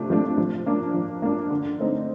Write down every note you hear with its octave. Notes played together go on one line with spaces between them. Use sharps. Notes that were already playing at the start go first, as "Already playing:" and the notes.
Already playing: C3 F3 A3 D4
F3 A3 D4
F3
A#3 D4
F3
A#3 D4
D3
A3 C4 D#4